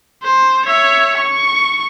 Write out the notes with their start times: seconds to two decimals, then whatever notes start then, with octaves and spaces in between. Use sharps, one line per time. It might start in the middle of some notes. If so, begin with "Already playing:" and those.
0.23 C5
0.66 C#5 E5
1.17 C#6